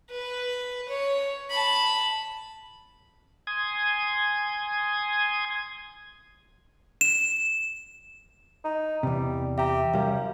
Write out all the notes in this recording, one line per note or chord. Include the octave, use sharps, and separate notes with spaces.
B4
C#5
A5 B5
G#5 C6 D#6 G#6
E7
D#4
E2 C3 G3
G4 E5 A#5
C2 F#2 G3 F5